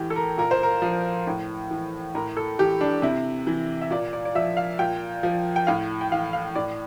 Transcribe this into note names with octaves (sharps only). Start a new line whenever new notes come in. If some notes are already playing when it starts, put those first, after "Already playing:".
Already playing: A2 E3 G4
A4
A#4
A#2 A#4
C5
A#4
F3
A2
E3
A2 A#4
A4
E3 G4
D4
C3 E4
E3
E5
A#2 D5
D5
D5
F3 E5
F5
A#2 G5
F3
G5
A2 F5
G5
E3 F5
F5
A2 D5